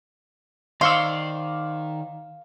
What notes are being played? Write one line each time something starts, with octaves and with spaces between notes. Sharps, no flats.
D#3 C5 D5 F5 C6 C#6 E6